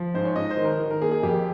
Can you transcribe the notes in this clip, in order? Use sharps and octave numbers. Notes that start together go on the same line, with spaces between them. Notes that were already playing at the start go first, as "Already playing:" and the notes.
Already playing: F3
G#2 C5
C#5
G#2 D#5
C5
D#3
A#4
D#3
A#4
A#3 G#4
G#4
F2 G4